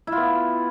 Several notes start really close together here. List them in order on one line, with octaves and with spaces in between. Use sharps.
E4 F4 B3